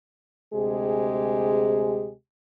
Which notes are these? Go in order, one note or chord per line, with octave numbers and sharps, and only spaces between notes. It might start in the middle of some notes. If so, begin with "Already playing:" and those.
D2 C3 G#3 G4 G#4